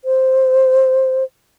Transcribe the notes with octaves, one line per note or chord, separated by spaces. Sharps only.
C5